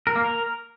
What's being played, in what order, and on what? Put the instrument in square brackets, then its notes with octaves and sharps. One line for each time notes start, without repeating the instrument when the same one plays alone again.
[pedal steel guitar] A#4
A#3
A#4